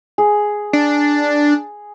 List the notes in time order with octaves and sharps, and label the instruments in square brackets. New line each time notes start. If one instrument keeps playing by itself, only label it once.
[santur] G#4
[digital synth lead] D4